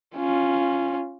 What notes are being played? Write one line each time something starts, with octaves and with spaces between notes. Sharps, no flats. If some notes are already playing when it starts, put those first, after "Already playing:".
C#4 F4